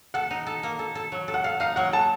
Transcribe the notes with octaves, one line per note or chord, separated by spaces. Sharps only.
A4 F#5
D#4
A4
A#3
A4
A4
F#3
A4
F#5
A4 F5
D#4 F5
F#3 F#5
A4 A5